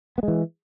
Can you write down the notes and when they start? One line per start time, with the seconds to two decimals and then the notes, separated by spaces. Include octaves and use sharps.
0.18 B3
0.23 G#3
0.28 E3